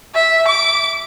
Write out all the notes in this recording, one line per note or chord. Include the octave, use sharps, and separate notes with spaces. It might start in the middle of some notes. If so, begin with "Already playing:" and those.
E5
D6